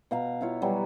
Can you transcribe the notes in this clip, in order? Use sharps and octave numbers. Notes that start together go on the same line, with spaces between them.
B2 F5 A#5
E4 F4 C#5
E3 F#3 G3